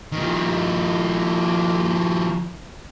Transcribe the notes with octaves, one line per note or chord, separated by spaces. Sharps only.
D#3 F3